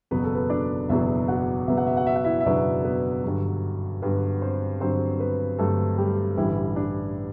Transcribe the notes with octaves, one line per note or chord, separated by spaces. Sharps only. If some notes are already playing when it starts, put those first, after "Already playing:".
F#1 E2 B2 F#3 B3 B4
A4
B3 B4
D4 D5
F#1 E2 B2 F#3 B3 E4 E5
F#4 F#5
F#1 E2 B2 F#3 B3 E5
F#5
E5
F#5
E5
F#5
E4 E5
E5
F#1 E2 B2 F#3 B3 D4 D5
B3 B4
G2 D3 F#3
G2 D3 F#3 B3 B4
C4 C5
G2 D3 F#3 C4 C5
B3 B4
G2 D3 F#3 A3 A4
G3 G4
A1 G2 D3 E3 G3 E4
D4